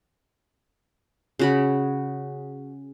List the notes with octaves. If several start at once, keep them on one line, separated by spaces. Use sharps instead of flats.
C#3 F#4 B5